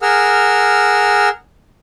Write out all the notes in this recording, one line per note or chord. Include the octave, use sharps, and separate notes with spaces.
G#4 A#4 F#5 E6 F6